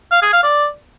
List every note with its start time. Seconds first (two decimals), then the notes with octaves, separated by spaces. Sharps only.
0.12 F5
0.22 G#4
0.33 F5
0.44 D5